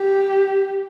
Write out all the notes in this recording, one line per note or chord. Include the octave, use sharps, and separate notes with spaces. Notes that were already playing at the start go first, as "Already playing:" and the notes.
Already playing: G4